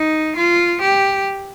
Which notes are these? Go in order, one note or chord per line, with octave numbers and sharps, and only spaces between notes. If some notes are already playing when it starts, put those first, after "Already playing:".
Already playing: D#4
F4
G4